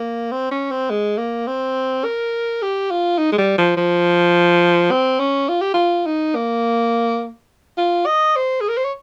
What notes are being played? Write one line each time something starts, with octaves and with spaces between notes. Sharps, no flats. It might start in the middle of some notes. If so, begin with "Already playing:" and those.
Already playing: A#3
C4
C#4
C4
G#3
A#3
C4
A#4
G4
F4
D#4
G#3
G3
F3
F3
C4
C#4
F4
G4
F4
D#4
A#3
F4
D#5
C5
G#4
A#4
C5
C#5